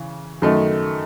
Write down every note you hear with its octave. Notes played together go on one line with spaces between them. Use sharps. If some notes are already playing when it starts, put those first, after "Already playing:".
Already playing: C#3 E3
F#2 D#3 A3 D#4